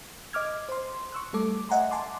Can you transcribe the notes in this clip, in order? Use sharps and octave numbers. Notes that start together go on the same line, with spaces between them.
D#5 D6 F6 G#6
C5 C6
C#6 E6 F#6
G3 A3 A4 D6
D#5 E5 F#5 G#5 A#5 C6
F#5 G#5 A5 C6 D6